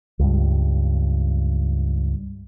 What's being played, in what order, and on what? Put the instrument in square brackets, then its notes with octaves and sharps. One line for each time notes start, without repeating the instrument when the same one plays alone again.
[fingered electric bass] C#2 G2